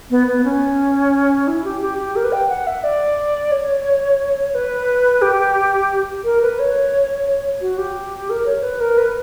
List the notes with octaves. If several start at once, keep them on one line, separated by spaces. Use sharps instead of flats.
B3
B3
C#4
E4
G4
G4
G4
A#4
B4
G5
F#5
E5
D5
C#5
B4
G4
A#4
B4
C#5
C#5
F#4
G4
A#4
C#5
B4
A#4
B4